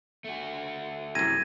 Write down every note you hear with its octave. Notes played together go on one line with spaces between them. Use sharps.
A3 F#4
C2 F#2 G#6 A#6 D#7